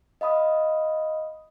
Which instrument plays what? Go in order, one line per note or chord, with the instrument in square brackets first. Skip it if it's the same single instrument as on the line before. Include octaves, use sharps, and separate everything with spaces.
[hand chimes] D#5 F5 B5 D#6